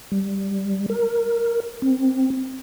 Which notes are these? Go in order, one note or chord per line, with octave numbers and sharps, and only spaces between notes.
G3
A#4
C4